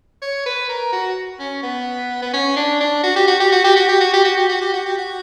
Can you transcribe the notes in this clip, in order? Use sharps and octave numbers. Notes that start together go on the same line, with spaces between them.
C#5
B4
A#4
F#4
C#4
B3
B3
C#4
D4
D4
F#4
G4
F#4
G4
F#4
G4
F#4
G4
F#4
G4
F#4
G4
F#4
G4
F#4
G4
F#4